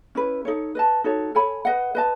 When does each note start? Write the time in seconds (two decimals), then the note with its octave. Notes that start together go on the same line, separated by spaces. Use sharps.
0.15 C#4 E4 B4
0.45 D#4 A4 C#5
0.75 B4 D#5 A5
1.04 D#4 F#4 A4 C#5
1.35 A4 C#5 G#5 B5
1.65 B4 D#5 F#5
1.95 B4 D#5 A5